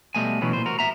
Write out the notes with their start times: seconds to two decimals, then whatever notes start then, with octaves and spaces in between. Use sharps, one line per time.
0.15 B2 G3 A3 D#5 G#5
0.41 B2 E3 F#3 B3 C#4
0.53 A#2 C5
0.66 F#4 A#4
0.79 E5 A#5